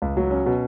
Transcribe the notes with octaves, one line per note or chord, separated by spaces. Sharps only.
C#2
F#3
C#4
B2